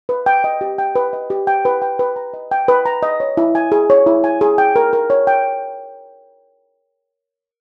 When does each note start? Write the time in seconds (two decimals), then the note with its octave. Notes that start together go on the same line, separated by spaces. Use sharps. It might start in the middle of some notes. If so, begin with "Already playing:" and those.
0.09 B4
0.26 G5
0.44 D#5
0.61 G4
0.78 G5
0.95 B4
1.13 D#5
1.30 G4
1.47 G5
1.65 B4
1.82 G5
1.99 B4
2.16 A#5
2.34 D#5
2.51 G5
2.68 B4
2.85 A#5
3.03 D#5
3.20 C#5
3.37 E4
3.55 G#5
3.72 G#4
3.90 C#5
4.07 E4
4.24 G#5
4.41 G#4
4.58 G5
4.76 A#4
4.93 A#4
5.10 C#5
5.27 G5